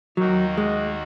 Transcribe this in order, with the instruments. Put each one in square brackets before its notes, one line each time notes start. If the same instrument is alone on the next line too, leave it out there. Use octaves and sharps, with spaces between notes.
[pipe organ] D#2 D#3 A#3 D#4 F#4 [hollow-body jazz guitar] F#3
[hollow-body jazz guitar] G#3